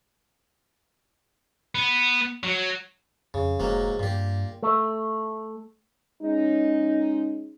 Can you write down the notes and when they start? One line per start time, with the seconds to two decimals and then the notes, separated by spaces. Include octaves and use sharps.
1.75 B3
2.44 F#3
3.34 F2 C#3
3.60 F1 G#2 F#3 A#3
3.99 G2 A#2 G4
4.63 A3
6.22 G#3 C#4 D#4